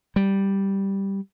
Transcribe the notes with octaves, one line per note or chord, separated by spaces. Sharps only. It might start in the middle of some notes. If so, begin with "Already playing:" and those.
G3